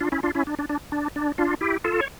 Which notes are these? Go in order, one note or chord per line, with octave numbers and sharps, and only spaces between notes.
D4 F4
C#4 E4
D4 F4
C#4 E4
D4
D4
D4
D4
D4
D4 F4
E4 G4
F4 A4
C#5